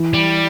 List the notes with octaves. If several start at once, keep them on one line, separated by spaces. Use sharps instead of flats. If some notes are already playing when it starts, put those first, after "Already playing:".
Already playing: E3
G3